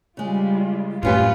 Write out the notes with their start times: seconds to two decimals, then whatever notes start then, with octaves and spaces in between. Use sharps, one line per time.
0.17 C#3 G3 G#3 F4
1.03 F#2 A2 E3 C#4 F4 G4 B4